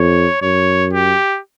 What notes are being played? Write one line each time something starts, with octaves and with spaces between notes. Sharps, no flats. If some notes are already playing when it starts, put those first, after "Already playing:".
Already playing: F2 C#5
F#2 C#5
G4